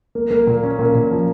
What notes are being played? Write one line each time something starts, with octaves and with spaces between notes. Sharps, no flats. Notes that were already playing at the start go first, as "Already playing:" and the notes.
A#3
A#3
A#2
C#4
A#2
A#2
F3